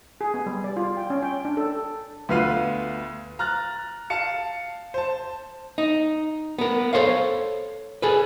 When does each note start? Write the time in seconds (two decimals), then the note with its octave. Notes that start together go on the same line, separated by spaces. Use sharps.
0.21 G#4
0.34 B3
0.46 G3
0.64 D5
0.77 F4
0.97 G5
1.10 C#4
1.23 G5
1.45 D4
1.57 A4
2.29 D2 B3 F4 B4 F5 C7
3.39 A#5 F6 F#6 A6
4.10 F5 A5 C#7
4.94 C5 A5
5.78 D#4
6.58 B3 A#4
6.93 A4 C5 C#5 F5
8.02 G#4 A4 B4